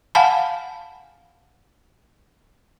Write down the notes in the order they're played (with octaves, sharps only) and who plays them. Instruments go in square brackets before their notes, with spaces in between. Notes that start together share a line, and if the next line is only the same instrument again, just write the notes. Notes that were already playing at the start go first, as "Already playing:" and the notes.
[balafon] F5 F#5 G#5 A5 B5